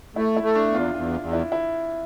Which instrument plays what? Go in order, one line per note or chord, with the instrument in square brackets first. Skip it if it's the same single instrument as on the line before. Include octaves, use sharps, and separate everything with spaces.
[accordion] A3 [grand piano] E4
[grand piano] E4
[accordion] A3
[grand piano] D4
[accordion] E2
[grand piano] F4
[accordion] E2 [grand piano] F4
[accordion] E2
[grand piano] E4
E4